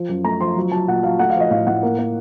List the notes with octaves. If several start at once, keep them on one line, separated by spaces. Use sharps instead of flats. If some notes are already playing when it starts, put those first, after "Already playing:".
Already playing: F3
F#2
A3 A#5
F3 C6
F#3
F#3 A5
A#2 F#5
F#3 F5
A3 F#5
F5
F3
D#5
A2 F5
A2 F#5
A#3
A#3